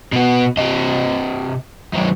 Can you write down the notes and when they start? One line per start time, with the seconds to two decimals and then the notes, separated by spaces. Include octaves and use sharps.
0.13 B2 B3
0.58 C3 D#5
1.93 D#3 F#3